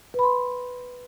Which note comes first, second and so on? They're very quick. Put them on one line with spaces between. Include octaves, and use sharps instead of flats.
B4 B5 C6